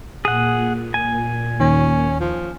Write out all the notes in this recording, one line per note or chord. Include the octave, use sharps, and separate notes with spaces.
A#2 G#4 F#5
G#5
D#2 D#3 C#4
F3